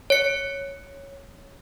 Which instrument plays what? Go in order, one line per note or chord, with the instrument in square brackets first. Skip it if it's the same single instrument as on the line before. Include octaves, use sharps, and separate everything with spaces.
[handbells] C#5 C#7